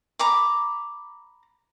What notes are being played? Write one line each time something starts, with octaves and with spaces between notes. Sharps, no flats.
A#5 B5 D6